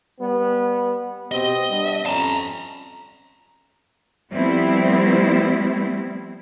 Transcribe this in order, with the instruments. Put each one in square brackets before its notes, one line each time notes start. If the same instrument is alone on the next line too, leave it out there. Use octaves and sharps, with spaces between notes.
[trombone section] G3 B3
[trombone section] B2 C4 G4 [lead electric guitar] D#5
[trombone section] G3 B3 D4
[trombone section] F2 C#4 [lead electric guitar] A5 A#5
[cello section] F3 G3 A3 B3 C4 E4